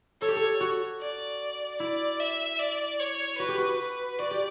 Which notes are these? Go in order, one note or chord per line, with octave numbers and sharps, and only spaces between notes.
A4 C#5
G4
A4
F#4
D5
E4 D5
E5
D5
C#5
F#4 B4
G4
F#4
B4
F#4 D5
G4